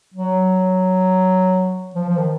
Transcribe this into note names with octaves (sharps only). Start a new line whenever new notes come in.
F#3
F3
F3
D#3